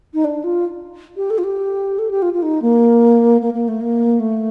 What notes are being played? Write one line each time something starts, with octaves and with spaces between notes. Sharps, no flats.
D#4
D4
F4
G4
A4
F4
G4
A4
G4
F4
F4
D#4
A#3
A#3
A#3
A3
A#3
A3